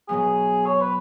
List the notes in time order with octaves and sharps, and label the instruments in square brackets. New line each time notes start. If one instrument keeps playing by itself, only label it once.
[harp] B2 F#3 B3 [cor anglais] G#4
[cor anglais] C#5
B4